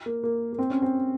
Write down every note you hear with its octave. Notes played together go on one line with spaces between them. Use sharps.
A#3
A#3
A#3
C4
C#4
C4